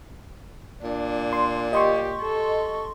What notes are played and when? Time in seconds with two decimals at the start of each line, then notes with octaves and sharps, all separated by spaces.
0.83 A#2 D4
1.33 C6
1.73 G4 D#5 C6 C#6
2.21 A4